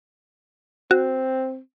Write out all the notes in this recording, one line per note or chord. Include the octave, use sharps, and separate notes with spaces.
C4 F#4